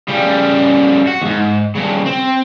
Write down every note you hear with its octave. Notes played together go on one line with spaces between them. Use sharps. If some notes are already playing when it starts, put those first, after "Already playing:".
C#3 G3
F#4
D#2 G#2
G2 C#3
C4